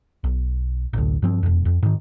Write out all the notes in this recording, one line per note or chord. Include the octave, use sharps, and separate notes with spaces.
B1
A1 D2
G2 F3 C4
E1 F2
F2
G#2 D#3